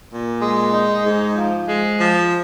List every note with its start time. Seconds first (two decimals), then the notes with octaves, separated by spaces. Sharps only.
0.11 A#2
0.42 G#3
0.73 D#4
1.04 G#2
1.36 F3
1.67 G#3
1.98 F3